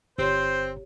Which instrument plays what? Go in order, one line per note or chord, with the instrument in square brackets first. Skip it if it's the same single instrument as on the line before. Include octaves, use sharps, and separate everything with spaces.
[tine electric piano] G1 [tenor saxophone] C4 [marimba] G4 C#5 [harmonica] C5